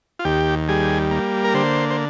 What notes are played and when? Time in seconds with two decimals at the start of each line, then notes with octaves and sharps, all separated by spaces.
0.19 F4
0.25 D#2 G4
0.68 G3 G#4
1.11 A#3
1.44 A#4
1.54 D3 C5
1.90 C5